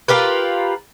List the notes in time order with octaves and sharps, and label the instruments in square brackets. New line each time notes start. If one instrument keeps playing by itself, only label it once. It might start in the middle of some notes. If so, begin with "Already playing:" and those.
[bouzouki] F4 G4 A#4 B4